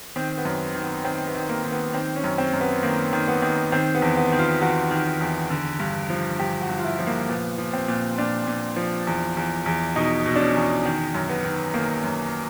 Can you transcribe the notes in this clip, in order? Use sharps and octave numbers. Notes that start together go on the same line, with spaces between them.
D#3 C4
B3
F#2
D#3
B3
D#3 C4
B3
D#3
A#3
D#3
B3
D#3 C4
C#4
F#2
C4
F#2
B3
D#3 A#3
D#3
B3
D#3
D#3 C4
B3
E2
B3
D#3
F4
E2 F#4
D#3
E2
D3
G2
F3
G2 G4
F#4
G2
F4
E4
F3
A#3
A#2 B3
F3
C4
A#2
A#2 D4
A#2
F3
E2
E2
E2
B2 D#4
B2
D4
C#4
E2
D#3
F#2
B3
D#3
D#3 A#3
F#2